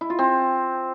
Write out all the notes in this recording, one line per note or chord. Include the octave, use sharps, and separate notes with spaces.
E4
F4
C4